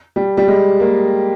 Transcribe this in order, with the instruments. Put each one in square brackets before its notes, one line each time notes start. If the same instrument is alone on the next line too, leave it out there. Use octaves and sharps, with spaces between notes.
[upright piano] G3
G3
G#3
A#3